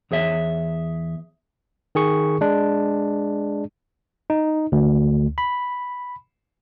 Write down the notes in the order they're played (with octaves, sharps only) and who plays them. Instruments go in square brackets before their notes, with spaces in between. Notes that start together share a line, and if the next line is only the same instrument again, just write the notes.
[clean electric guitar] E2 G#4 C#5 E5
[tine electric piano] D#3 G#4 C#6
G#3 D4
D#4
D2
B5